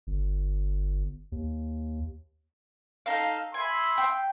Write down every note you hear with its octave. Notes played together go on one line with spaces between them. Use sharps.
G1
D#2
D#4 A4 F5
E5 G#5 B5 C6
G5